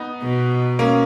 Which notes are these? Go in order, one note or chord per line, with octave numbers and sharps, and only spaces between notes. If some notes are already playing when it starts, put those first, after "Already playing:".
Already playing: B3 D#4
B2
A#3 C#4